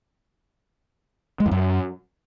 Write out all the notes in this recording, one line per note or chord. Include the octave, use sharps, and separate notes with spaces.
G#3
F2
F#2